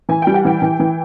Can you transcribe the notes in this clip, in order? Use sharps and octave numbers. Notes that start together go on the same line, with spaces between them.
E3 G#5
G3 G5
F#5
E3 G5
E3
E3